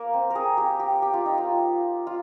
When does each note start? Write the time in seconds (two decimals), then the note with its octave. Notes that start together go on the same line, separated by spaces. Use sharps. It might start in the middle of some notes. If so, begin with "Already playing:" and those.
Already playing: A#3
0.14 C4
0.30 A#4
0.35 G#4
0.57 G4
0.80 G4
1.02 G4
1.14 F4
1.26 D#4
1.38 F4
2.07 F4